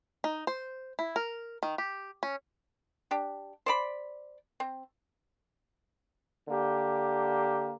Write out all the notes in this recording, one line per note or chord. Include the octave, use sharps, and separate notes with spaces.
D#4
C5
E4
A#4
D#3
G4
C#4
D4 G4
C5 D5 B5
C4
D3 A#3 G4